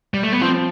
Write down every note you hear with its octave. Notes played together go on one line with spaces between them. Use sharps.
G3
A3
B3
F3 C4